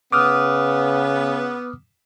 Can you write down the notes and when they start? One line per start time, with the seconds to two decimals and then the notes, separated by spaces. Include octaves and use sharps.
0.12 C#3 B3 D6 D#6 F6